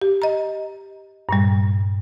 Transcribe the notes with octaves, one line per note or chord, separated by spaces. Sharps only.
G4
D#5 A#5
G2 A#2 G3